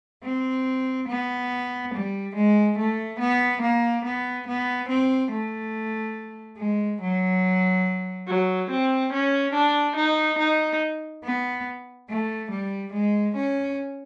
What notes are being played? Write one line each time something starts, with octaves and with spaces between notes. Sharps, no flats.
C4
B3
G3
G#3
A3
B3
A#3
B3
B3
C4
A3
G#3
F#3
F#3
C4
C#4
D4
D#4
D#4
B3
A3
G3
G#3
C#4